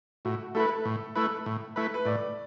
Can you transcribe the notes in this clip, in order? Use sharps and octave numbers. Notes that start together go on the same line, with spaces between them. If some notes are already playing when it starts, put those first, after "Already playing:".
A2 F#4
A3 E4 A4 B4
A2
A3 E4 B4
A2
A3 E4 B4
B4
A2 D5